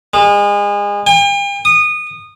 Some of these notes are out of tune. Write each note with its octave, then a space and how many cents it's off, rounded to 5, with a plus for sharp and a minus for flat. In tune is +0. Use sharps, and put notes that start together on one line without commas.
G#3 -30
G5 +45
D#6 -20